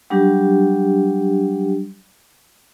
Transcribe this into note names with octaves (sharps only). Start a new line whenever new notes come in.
F#3 G3 D4 G4